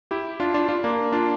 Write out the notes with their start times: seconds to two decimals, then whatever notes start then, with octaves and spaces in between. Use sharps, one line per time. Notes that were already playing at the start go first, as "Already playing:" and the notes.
0.11 E4 G4
0.40 D4 F4
0.54 D4 F4
0.69 D4 F4
0.84 A#3 D4
1.12 D4 F4